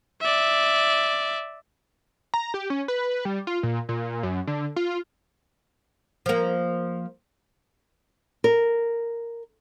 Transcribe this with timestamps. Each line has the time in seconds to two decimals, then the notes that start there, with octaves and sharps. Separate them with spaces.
0.21 D5 E5
2.34 A#5
2.54 G4
2.70 C#4
2.88 B4
3.25 G3
3.47 F4
3.63 A#2
3.89 A#2
4.23 F#2
4.47 D3
4.76 F4
6.26 F3 A#3
8.44 A#4